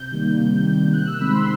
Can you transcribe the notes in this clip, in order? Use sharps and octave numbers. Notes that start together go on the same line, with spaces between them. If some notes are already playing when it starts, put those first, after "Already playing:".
Already playing: C3 G6
D#3 G3 A#3
C3
D#3 G3 A#3
C3 F#6
E6
D#3 G#3 C4 B5
C6